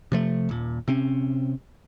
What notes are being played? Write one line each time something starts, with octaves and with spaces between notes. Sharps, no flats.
C3 F3 A3
D#1 A#2
C3 C4 C#4